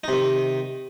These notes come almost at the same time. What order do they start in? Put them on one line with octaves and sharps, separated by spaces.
D#4 C3 D#3